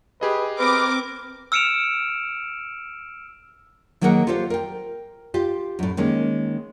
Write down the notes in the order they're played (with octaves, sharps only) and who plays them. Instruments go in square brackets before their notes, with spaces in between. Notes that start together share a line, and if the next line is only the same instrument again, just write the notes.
[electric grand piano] G4 G#4 D#5 [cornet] B4
[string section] C4 D6 [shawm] A#4 [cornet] B4
[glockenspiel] E6 F6 C#7 D7 E7 F7
[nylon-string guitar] D#3 F#3 A#3 G#4 A#4 F#5
F4 G4 A4 C5 F5
A#4 G5
F4 G4
F#2 A2
D#3 G#3 A#3 C#4